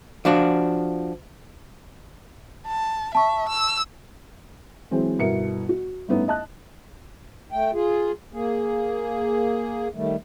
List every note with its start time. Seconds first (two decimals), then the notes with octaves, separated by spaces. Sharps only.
0.25 F3 D4 F#4
2.67 A5
3.15 E5 A5 C#6
3.49 E6
4.91 E3 F#3 G#3 C4
5.19 G1 B2 B3 E4 A#4 C#7
5.69 F#4
6.08 G2 A3 B3 C#4 D#4
6.28 D#5 A5 F#6
7.50 A3 G5
7.74 F4 G#4
8.33 A#3 G#4
9.94 D#3 G3 A3